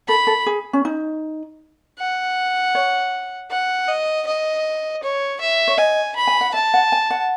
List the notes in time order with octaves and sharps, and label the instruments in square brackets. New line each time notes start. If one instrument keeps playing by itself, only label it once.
[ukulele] A4 [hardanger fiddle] B5
[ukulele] A4
G#4
C#4
D#4
[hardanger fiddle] F#5
[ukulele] C#5
[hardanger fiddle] F#5
D#5
D#5
C#5
E5
[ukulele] C#5
[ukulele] D#5 [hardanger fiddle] G#5
[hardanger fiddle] B5
[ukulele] G#5
F#5
[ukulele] E5 [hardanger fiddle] A5
[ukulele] F#5
G#5
F#5